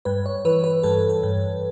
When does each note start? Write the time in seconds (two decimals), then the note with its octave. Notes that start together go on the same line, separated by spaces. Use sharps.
0.05 G2 B4
0.26 C#5
0.45 E3 B4
0.64 B4
0.83 G2 A4
1.09 A4
1.23 G2